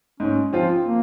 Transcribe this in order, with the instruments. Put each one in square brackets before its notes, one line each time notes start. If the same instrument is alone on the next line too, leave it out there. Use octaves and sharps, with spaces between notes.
[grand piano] G#2 [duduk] C#4
[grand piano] F3 C4 F4
[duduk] A#3